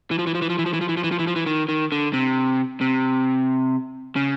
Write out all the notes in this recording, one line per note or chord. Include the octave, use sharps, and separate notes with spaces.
E3
F3
E3
F3
E3
F3
E3
F3
E3
F3
E3
F3
E3
F3
E3
F3
E3
D#3
D#3
D3
C3
C3
C#3